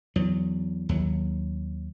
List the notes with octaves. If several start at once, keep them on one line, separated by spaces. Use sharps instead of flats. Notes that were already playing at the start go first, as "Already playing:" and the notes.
E2 F#3
D#2 F#3